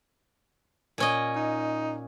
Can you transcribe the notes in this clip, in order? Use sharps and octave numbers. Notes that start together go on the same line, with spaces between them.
A#2 C#4 D#5
D#4